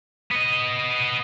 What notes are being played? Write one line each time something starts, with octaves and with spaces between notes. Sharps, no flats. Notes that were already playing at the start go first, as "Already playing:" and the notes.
B3 D#5